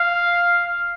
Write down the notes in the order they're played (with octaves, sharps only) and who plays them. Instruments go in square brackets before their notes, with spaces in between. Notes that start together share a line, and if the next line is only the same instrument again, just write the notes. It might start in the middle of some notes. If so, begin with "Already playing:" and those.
Already playing: [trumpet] F5